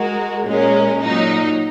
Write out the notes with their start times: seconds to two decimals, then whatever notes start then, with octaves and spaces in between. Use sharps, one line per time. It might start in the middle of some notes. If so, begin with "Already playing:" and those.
Already playing: G#3 F#4 A#4
0.44 A#2 G#3 C#4 A#4
1.01 A#2 F#3 D#4